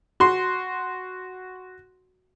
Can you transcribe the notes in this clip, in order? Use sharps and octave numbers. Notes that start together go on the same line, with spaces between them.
F#4 C6